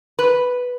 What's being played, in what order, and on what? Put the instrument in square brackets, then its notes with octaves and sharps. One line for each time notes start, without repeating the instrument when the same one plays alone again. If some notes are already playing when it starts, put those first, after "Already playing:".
[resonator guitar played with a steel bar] B4